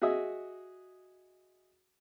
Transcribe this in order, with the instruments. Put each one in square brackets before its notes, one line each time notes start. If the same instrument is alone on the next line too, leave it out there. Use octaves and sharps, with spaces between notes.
[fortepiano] F#4 G#4 D#5 E5 D#6